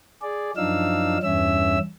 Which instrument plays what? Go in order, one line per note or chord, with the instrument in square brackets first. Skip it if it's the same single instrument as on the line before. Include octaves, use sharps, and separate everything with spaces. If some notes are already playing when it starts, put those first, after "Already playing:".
[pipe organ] G#4 D5
F#2 F3 D4 D#4 F5 E6
E2 G2 C#4 E5 E6